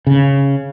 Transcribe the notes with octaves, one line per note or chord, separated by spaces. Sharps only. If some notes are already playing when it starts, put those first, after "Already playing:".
C#3